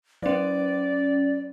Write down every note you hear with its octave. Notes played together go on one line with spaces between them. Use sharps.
F#3 C#4 D5